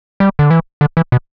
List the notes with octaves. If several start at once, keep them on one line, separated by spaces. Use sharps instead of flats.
G3
D3
E3
D3
E3
B2